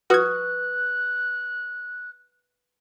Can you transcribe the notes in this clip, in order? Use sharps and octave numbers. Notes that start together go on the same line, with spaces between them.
F#4 B4 C#6 D#6 F#6 G#6